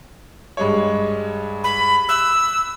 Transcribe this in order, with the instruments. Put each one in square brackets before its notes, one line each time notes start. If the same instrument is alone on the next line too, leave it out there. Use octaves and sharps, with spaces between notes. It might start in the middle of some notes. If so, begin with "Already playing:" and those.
[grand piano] G2 G#3 C#5
[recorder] B5
[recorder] E6 [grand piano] F#6